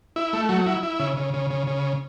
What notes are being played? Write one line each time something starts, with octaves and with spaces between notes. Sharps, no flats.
E4
A3
F#3
E4
E4
C#3
C#3
C#3
C#3
C#3